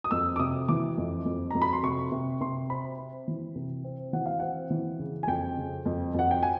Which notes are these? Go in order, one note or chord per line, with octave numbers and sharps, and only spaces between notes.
D#6
F2 E6
D6
C3 D#6
E3 D6
F2
F2
F2 A#5
B5
C6
C3 C#6
C3
C3 C6
C4 B5
C4
E3
C3
C4
E3 F#5
F5
C4 F#5
E3
C#3
G#5
F2 G5
C#3
F2
F2 F#5
G5
G#5